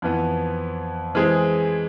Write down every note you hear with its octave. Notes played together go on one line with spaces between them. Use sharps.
F2 E3 B3
E3 G#3 C4 G#4